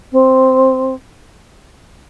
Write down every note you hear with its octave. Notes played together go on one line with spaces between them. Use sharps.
C4